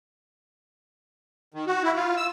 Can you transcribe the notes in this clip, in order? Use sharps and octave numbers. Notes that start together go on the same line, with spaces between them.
D#3
F#4
E4
F4
E6